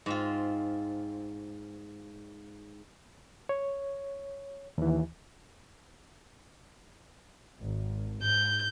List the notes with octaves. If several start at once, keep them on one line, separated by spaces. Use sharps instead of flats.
G#2 C4 F4
C#5
D#2 E3
G#1
G#2 G6